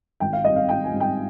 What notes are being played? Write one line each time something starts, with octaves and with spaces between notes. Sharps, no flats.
G#1 G5
F5
G#2 G3 C4 D#5
F5
G#1 G5
G#5
G#2 G3 C4
G5